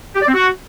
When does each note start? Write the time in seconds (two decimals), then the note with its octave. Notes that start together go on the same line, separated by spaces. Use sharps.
0.15 G4
0.22 D5
0.28 C4
0.34 F#4